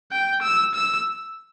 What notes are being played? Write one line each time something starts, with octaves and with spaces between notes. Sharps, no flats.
G5
E6
E6